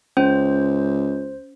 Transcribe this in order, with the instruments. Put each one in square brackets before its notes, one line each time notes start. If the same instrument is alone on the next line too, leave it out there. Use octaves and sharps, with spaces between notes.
[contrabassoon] C#2 [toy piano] C#4 [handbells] C5